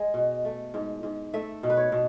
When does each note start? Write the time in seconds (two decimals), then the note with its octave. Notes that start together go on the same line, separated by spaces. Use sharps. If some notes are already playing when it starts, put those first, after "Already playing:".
Already playing: G#3
0.14 B2
0.45 A3
0.74 G#2
1.03 G#2
1.33 A3 E5
1.63 B2
1.70 B4
1.77 C#5
1.92 B2